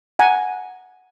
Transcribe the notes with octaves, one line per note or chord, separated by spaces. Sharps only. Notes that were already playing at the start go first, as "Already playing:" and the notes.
F#5 G#5 A#5